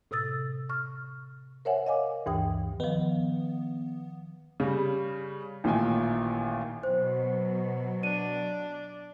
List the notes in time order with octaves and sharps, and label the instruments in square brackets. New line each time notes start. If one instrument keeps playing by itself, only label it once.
[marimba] A2 C3 D#6 E6 A6
C#6 F6
A#4 C5 C#5 E5 F#5 G#5
D#5 F5 G#5 D6
D2 G2 E3 G5 D#6
[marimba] D#3 F3 [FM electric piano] B3
[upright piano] C#3 G3
A1 A#2 D#3 G5 G#5
[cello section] B2 F#3 [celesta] C5
[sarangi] D4 [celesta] D#7